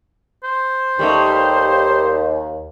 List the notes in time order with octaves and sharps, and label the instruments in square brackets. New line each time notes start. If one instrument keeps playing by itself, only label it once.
[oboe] C5
[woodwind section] D#2 [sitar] G3 A3 D#4